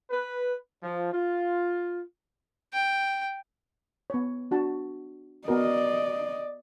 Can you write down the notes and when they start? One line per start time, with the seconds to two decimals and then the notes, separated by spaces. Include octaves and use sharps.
0.11 B4
0.83 F3
1.13 F4
2.73 G5
4.10 B3 C#5
4.51 D4 F#4 A5
5.48 B3 F#4 A#4 D5 D#5